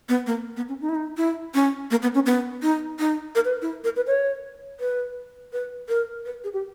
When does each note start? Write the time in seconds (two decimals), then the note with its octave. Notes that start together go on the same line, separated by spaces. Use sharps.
0.09 B3
0.26 A#3
0.57 B3
0.69 C#4
0.81 D#4
0.89 E4
0.95 D#4
1.17 E4
1.54 C#4
1.91 A#3
2.02 B3
2.14 C#4
2.26 B3
2.62 D#4
2.99 D#4
3.35 A#4
3.45 B4
3.62 E4
3.84 A#4
3.96 B4
4.07 C#5
4.80 B4
5.53 B4
5.89 A#4
6.26 B4
6.44 G#4
6.53 G4